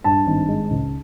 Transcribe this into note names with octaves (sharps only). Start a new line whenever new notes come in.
G2 A5
G#1
G#3
C#2